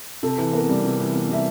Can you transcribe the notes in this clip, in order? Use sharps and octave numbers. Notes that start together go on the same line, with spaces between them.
C3 A4
E3
B3 A#4
G3
C3
E3
B3
G3 E5